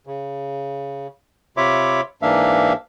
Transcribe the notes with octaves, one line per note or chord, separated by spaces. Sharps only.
C#3
C3 F4 C#5 E5 B5 D6
G#2 E3 A#3 D4 E5 F5